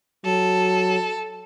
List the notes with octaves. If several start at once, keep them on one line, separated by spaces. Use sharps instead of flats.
F#3 A4